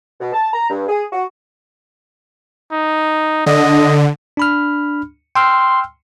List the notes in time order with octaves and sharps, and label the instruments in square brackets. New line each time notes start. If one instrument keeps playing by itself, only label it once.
[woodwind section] B2
A5
A#5
G2
G#4
F#4
[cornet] D#4
[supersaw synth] D3 [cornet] D#5
[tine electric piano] D4 B5 F6
[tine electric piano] G5 E6 F6 [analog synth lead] C6